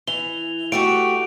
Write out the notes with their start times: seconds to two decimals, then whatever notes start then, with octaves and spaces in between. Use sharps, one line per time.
0.07 E3 F7 G7
0.72 A3 F#4 G4 D7